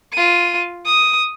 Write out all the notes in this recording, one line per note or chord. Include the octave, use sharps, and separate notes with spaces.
F4 D#7
D#6